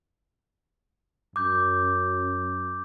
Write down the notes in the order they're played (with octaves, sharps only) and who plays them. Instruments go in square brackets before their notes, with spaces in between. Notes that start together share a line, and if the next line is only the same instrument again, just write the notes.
[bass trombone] F#2 [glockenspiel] D6 G6